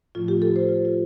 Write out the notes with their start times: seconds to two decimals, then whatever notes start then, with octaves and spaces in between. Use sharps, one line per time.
0.15 A2 F3 A3 F4
0.28 G4
0.42 A4
0.56 C5
0.69 F4
0.85 F4